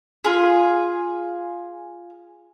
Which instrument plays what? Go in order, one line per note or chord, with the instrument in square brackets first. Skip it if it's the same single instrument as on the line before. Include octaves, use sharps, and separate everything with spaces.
[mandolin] F4 G#4